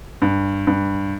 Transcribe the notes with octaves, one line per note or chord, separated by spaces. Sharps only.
G2
G2